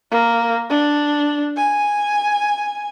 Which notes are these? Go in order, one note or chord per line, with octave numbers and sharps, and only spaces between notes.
A#3
D4
G#5